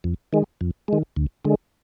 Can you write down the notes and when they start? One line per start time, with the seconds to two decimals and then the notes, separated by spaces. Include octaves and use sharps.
0.04 F2
0.33 D#3 G#3
0.61 F2
0.88 D#3 G#3
1.16 D2
1.45 D3 G#3